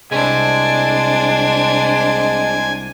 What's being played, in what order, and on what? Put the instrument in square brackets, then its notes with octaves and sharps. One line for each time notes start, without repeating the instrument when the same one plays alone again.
[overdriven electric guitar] C2 C3 [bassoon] G#3 [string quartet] D4 C5 [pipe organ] G#5